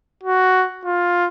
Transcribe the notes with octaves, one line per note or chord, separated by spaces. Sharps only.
F#4
F4